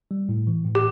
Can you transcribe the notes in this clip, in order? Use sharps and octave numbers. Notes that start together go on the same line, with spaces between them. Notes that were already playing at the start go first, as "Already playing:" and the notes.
G3
A2
E3
A2
G4